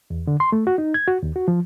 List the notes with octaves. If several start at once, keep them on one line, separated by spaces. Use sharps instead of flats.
E2
D3
C6
A3
F#4
D#4
G#6
F#4
D#2
F#4
F3